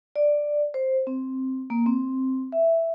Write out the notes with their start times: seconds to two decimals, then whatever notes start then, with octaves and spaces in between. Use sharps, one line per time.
0.16 D5
0.74 C5
1.07 C4
1.70 A#3
1.86 C4
2.52 E5